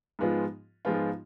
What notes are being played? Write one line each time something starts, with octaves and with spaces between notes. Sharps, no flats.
G#2 F3 G#3 B3 F4
G#2 F3 G#3 B3 F4